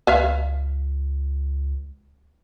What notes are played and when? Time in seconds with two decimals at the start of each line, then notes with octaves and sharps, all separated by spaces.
0.07 C#2 B4 E5 F5